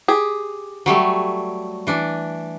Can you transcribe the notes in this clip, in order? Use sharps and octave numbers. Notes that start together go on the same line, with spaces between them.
G4 G#4
F#3 G3 A3
E3 D4